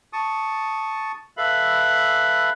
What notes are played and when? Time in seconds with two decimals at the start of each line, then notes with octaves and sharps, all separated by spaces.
0.13 A5 C#6 D#6
1.37 A4 B4 E5 F5 B5